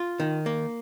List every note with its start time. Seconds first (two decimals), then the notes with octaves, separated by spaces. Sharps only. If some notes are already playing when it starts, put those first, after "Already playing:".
Already playing: F4
0.20 D#3
0.46 A#3